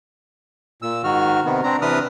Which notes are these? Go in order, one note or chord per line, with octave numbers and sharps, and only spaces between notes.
A#2 E6
G#2 D#3 F#4 F6
C3 D#3 B3
C4 D4 A#5
C3 E3 D4 B4 D#6 F6